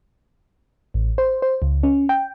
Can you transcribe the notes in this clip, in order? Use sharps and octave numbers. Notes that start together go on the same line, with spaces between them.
A1
C5
C5
C#2
C#4
G5